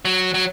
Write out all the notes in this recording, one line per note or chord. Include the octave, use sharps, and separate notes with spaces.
F#3
F#3